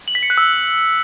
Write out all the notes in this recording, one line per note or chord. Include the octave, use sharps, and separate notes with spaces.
F#7
B6
C#7
F#6
E6